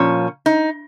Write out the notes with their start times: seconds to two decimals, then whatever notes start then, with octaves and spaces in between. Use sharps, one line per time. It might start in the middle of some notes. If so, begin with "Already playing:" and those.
Already playing: A#2 F3 C#4
0.46 D#4